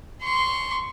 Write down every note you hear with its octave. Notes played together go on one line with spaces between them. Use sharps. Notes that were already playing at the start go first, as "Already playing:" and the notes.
C6 C#6